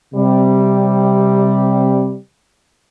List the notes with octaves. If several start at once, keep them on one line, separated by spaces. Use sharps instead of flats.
C3 G3